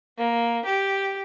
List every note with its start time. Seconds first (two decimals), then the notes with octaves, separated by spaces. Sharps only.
0.17 A#3
0.65 G4